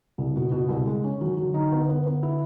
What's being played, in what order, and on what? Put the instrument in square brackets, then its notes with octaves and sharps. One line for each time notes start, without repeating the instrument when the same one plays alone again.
[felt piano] C2 [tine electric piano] C#3
[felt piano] B2
B2
C2
G#3
C#4
[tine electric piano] D#3 [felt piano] F#3
[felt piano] F#3
[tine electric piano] D3
[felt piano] D#4
[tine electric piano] D3 [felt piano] B3
[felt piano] B3
B3
E4